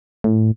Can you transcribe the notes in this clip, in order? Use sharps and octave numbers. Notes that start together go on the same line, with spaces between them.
A2